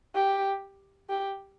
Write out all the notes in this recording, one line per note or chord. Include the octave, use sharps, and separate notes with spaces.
G4
G4